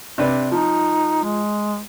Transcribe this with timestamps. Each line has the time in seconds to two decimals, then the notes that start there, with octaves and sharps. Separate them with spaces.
0.18 C3 D4 B4
0.52 F3 D#4
1.24 G#3